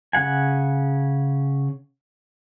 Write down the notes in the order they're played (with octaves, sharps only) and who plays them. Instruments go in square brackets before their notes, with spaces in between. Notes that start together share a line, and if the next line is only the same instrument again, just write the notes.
[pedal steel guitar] C#3 G3 F#5 G#5